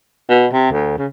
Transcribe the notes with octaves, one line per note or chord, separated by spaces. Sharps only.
B2
C3
D2
C#3